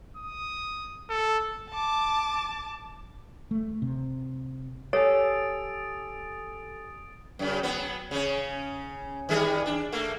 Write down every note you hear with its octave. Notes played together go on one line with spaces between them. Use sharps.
D#6
A4
A5 D6
A3
C3
G4 A4 C#5 G#5 D#6 A6 D7
F#2 C#3
F#3 B3
C#3 C#4
D#3 G3 G#4
D4
A3 A#3